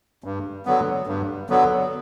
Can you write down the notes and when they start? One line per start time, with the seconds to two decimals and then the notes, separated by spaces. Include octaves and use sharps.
0.24 G2
0.66 D3 F#3 B3
1.07 G2
1.50 D3 F#3 B3